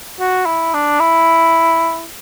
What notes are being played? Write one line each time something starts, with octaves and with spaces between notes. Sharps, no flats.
F#4
E4
D4
E4